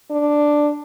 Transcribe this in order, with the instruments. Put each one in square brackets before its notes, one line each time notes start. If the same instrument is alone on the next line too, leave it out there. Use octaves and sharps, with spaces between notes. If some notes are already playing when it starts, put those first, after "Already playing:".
[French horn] D4